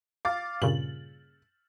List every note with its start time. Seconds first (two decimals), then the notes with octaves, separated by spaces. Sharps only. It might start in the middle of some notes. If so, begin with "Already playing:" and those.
0.25 F5 D6 A6
0.62 G2 A#2 C#3 F#7